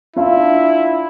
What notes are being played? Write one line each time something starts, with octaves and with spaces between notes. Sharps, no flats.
D4 E4 F4 E5